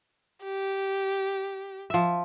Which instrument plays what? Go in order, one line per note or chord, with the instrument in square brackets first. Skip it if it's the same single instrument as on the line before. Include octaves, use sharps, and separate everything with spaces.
[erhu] G4
[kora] F3 E5